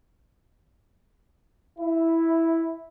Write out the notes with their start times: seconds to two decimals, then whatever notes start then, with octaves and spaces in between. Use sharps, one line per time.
1.79 E4